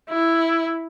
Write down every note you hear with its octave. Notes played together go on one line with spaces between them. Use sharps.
E4